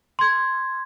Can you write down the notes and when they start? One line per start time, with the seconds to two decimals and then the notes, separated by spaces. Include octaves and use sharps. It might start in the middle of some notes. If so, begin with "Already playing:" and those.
0.19 C6 G#6